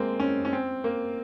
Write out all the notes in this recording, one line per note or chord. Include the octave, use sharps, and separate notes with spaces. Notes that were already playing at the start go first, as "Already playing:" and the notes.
Already playing: G#3 A#3 C4
C#4
C#4
C4
A#3